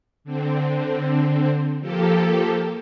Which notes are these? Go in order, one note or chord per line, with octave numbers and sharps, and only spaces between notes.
D3 C4
F3 A#3 G4 A4